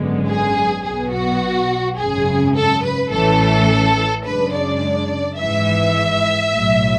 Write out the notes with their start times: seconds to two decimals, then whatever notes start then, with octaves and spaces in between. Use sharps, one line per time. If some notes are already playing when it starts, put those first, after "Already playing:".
Already playing: G#1 F#2 D3 G#3 B3
0.28 G#4
0.84 B1 B2 F#3 B3 G#4
1.13 F#4
1.98 G#1 F#2 C#3 G#4
2.56 A4
2.84 B4
3.11 A1 A2 E3 A3 C#4 A4
4.25 F#2 C#3 G#3 D4 B4
4.54 D5
5.39 G#1 G#2 E3 E5
6.53 B1 A2 F#3